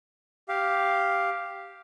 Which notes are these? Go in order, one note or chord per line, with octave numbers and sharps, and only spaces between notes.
G4 F5